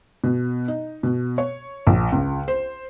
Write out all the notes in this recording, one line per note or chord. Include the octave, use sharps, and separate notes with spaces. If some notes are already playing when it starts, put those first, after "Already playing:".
B2
D#4
B2
C#5
A#1
C#2
C5